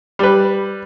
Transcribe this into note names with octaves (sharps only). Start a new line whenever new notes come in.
G3 B4